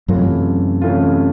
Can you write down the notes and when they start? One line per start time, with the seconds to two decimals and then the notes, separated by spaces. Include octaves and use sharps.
0.08 F#2 C3 E3 F#3 A3 C#4 F4
0.81 C3 E3 A3 C#4 F4